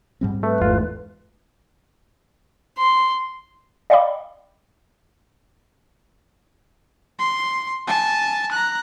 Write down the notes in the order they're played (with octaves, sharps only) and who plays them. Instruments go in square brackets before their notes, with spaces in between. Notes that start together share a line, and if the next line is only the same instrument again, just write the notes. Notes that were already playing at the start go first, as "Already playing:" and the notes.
[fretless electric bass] G#2 G3 C4
[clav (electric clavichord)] A3 [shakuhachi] B4
[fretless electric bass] G1 [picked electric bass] E2 G#2 A3 [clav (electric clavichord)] F4
[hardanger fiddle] C6
[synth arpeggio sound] D5 D#5 F5 G5 B5 D6
[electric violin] C6
G#5 A5
A#5 F#6